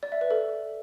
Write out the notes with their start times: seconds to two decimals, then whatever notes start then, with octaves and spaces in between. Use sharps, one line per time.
0.03 D5
0.12 E5
0.21 B4
0.31 A4